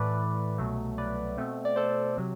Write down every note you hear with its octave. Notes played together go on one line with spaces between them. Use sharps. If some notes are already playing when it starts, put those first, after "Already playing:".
Already playing: A2 E3 A3 B4 D5
C2 B2 F#3 A3
B4 D5
B2 A3 C4
D5
A4 C5
C3 F#3